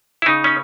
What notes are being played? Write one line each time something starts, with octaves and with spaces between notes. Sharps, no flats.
E4
C#3 D#4
C#4